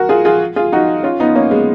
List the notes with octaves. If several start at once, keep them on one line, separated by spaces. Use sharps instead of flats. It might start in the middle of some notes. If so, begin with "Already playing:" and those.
Already playing: F#4 A#4
F4 G#4
F4 G#4
F4 G#4
D#4 F#4
C#4 F4
B3 D#4
A#3 C#4
G#3 B3